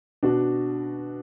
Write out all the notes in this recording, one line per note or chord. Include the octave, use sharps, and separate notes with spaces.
B2 D4 F#4